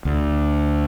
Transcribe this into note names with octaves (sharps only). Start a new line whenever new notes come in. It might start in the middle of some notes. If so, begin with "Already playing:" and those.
D2